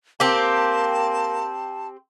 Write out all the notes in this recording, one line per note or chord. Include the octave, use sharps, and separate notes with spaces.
A#3 C4 G4 A5